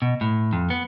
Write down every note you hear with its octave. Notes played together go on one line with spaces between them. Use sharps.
B2
A2
F2
B3